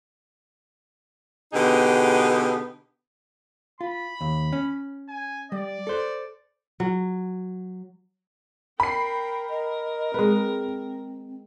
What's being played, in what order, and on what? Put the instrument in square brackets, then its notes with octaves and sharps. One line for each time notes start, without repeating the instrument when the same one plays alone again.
[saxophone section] B2 D3 B3 D#4 G4 G#4
[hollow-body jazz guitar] F4 [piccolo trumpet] B5
[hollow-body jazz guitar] D#2
C#4
[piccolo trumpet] G#5
[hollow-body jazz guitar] G3 [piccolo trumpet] D5
[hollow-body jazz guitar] A4 C5
[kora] F#3
[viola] A#4 G5 [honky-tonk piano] B5 C7
[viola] A#4 [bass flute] D#5
[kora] G#3 B4 [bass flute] C4